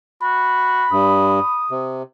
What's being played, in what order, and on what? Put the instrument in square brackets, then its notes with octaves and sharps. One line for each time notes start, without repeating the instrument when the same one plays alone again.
[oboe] F#4 [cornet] B5
[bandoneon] G2 [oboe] D#6
[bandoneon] C3